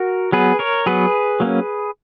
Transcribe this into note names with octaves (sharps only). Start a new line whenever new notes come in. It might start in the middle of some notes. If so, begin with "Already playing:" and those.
Already playing: F#4 A#4
F#3 B3 G#4 B4
A#4 C#5
F#3 B3 G#4 B4
F#3 A#3 C#4